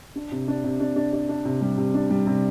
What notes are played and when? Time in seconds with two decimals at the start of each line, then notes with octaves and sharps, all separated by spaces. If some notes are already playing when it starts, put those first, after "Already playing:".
0.15 D4
0.32 C3
0.48 D4
0.64 C3
0.80 D4
0.96 D4
1.13 D4
1.29 D4
1.45 C3
1.61 G3
1.78 C3
1.94 D4
2.10 G3
2.27 C3